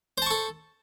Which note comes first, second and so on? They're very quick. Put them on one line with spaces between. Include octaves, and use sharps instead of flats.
C5 A5 C#6 A4